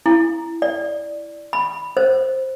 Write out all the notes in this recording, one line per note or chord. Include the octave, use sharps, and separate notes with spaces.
E4
D5
B5
C5